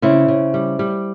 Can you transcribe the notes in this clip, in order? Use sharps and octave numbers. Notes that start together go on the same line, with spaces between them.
C#3 C4 E4
C#3
G3
G3